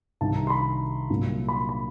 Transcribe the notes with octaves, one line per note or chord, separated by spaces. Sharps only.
C2 C3 D#3 A5
A#5
C6
B5
C2 A#2 F#3
B5
C6
B5